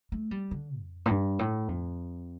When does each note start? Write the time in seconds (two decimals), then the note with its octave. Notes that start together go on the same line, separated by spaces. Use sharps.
0.12 A3
0.31 G3
0.51 D3
0.81 F2
1.06 A2
1.10 G2
1.39 A2
1.68 F2